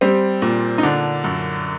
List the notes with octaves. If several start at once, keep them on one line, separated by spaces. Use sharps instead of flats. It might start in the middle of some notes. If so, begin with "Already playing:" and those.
G3 C4
A#2
D#4
D3 D4
F#2